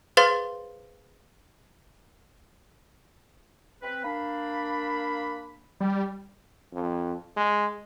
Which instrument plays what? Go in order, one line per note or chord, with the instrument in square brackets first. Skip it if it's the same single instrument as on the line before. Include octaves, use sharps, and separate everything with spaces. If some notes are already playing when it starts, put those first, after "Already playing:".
[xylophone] G#4 B4 C5 F5 C6 A6
[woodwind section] C4 B4
A#3 D4 B5
[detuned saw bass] G3
[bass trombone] F2
G#3